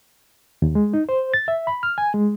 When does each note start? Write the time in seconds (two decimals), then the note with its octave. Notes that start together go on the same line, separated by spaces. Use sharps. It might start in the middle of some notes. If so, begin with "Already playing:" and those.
0.62 D#2
0.75 G#3
0.94 D#4
1.09 C5
1.34 A6
1.48 E5
1.67 B5
1.83 F6
1.98 G#5
2.14 G#3